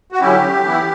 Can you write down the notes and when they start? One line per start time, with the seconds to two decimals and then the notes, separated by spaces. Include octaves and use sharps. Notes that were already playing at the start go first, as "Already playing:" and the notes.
0.12 F#4
0.20 D3 F#3 C#4 E4 G4
0.63 E3 B3 E4